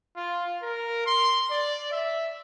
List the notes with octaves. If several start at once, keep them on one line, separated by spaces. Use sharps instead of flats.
F4
A#4
C6
D5
E5